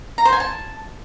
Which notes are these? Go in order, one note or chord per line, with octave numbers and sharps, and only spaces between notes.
A#5
C5
G#5
A5